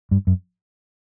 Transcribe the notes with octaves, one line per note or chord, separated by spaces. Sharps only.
G2
F#2